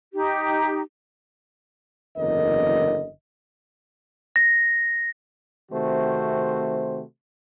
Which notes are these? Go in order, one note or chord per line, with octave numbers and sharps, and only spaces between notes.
D#4 G4
F#1 E2 D3 A#4 D#5
A#6
C3 D#3 A3 C4 F#4 C5